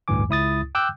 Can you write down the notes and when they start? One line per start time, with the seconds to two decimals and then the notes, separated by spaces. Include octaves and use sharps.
0.08 A1 D2 G2 E3 G#5 D6
0.29 C#2 E4 D#6 A6
0.75 G5 D6 E6 F#6 G6